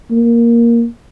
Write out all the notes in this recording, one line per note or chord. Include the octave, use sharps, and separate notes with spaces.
A#3